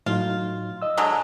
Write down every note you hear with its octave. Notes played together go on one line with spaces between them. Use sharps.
A2 F#3 D#4 F4
D#5 E6
D3 F#3 G#3